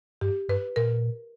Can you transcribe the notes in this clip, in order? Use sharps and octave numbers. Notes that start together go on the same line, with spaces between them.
G2 G4
G2 B4
A#2 A#4